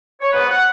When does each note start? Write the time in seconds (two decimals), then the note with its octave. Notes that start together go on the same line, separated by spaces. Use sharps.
0.21 C#5
0.32 G#2 F#3 B3 B4
0.49 F#5